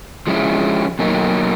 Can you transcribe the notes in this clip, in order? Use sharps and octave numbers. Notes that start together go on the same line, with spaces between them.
F3 G#3 C#4 E4
B2 F#3 A#3 D#4